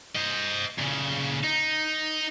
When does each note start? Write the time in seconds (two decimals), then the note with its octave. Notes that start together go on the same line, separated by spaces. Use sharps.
0.15 C5 D#5
0.78 A#2 C#3
1.44 D#4